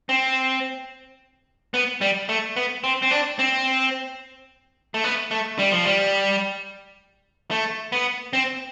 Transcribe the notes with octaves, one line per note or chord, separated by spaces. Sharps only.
C4
B3
G3
A3
B3
C4
C4
D4
C4
A3
B3
A3
G3
F3
G3
A3
B3
C4